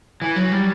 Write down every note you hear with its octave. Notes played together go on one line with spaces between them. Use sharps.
E3
F#3
G3